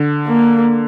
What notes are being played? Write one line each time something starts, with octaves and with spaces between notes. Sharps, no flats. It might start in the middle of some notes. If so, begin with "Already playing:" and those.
Already playing: D3
A#3